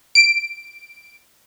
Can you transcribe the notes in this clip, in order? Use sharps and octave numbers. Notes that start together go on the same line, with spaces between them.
D7